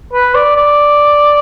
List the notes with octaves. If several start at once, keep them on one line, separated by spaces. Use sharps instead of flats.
B4
D5
D5